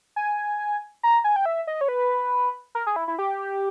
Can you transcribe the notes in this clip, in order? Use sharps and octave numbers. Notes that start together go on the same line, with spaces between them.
G#5
A#5
G#5
G5
E5
D#5
C#5
B4
A#4
G#4
E4
E4
G4